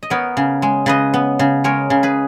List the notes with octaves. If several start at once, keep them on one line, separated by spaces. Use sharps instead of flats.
D#5
B3 A#4 C#5
C#3
G#3
C#3 B4 D#5
B3
C#3
G#3 A#4 C#5
C#3
G#4 B4